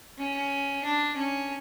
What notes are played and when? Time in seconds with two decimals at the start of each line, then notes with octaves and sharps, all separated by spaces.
0.18 C#4
0.84 D4
1.15 C#4